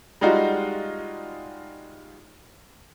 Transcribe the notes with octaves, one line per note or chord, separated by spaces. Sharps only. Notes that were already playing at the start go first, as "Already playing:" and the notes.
G3 G#3 D#4 F4 F#4